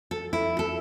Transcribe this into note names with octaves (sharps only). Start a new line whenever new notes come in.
A4
E4
A4